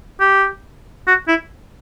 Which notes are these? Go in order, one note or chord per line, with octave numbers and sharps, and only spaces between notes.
G4
F#4
E4